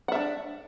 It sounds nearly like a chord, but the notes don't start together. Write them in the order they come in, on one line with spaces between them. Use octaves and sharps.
F#5 E5 D4